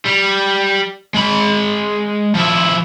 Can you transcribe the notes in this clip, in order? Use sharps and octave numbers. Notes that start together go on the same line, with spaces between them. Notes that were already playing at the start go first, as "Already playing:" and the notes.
G3
G#3 B5
F3 E4